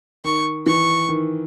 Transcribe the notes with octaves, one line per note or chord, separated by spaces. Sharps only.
D#3 C#6
E3 C#6
D#3